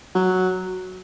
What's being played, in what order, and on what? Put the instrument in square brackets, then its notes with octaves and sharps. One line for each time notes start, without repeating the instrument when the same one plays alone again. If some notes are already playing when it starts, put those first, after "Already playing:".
[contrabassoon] F#3